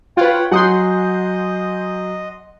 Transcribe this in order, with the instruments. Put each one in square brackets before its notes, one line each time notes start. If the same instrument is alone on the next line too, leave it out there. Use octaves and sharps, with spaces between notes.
[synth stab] F4 B4 [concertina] C#5 F#5 G5
[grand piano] F#3 [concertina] D#5 [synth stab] F#5 C6 [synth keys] G#5 D#6 G6